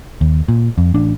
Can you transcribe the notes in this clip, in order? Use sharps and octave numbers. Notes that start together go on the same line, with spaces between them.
D#2
A#2
F2
A1 D4